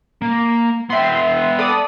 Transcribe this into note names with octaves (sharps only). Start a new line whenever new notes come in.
A#3
B3 E5 G5 C6
A4 D5 D#6